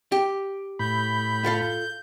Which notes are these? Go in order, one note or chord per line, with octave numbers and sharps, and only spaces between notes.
G4
A2 B5 G6
F4 A4 F5